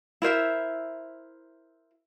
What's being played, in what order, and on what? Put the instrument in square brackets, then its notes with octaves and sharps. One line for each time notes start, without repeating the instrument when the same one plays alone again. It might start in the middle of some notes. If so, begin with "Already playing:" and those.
[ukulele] E4 A#4 C5 E5